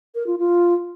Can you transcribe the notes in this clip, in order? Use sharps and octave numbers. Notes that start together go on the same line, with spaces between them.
A#4
F4
F4